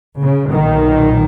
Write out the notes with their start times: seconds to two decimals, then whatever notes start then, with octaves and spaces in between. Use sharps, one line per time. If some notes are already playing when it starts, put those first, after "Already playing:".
0.19 C#3
0.51 B1 A#2 D#3